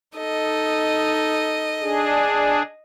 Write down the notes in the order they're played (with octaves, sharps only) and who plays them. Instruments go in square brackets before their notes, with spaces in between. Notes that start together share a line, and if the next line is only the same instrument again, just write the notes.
[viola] D#4 A4 [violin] D#5
[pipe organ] D4 G#4